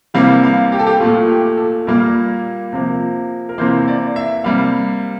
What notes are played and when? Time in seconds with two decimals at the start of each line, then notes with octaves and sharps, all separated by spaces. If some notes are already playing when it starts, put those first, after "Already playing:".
0.14 C3 E3 G3 A#3 F5
0.44 F5
0.72 G4
0.79 A4
0.87 G4
1.00 A#2 A3 F4
1.29 G4
1.57 A4
1.87 A#2 G3 A#3 A#4
2.73 C3 F3 A#3
3.49 A#4
3.58 C3 E3 A#3 C5
3.88 D5
4.16 E5
4.44 C3 G3 A#3 F5